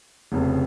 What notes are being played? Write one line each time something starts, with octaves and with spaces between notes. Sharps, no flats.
F1 F2 C#3